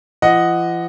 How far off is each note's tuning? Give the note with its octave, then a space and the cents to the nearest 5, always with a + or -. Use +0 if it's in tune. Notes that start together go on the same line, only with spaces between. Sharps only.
F3 -45 D#5 +0 F#5 +0